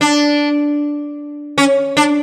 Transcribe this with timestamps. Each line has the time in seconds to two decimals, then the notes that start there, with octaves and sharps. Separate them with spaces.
0.01 D4
1.58 C#4
1.97 D4